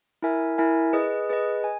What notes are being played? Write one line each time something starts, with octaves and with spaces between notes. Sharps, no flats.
E4 A#4 E5 G#5
E4 A#4 E5 G#5
G#4 B4 D#5
G#4 B4 D#5
G#5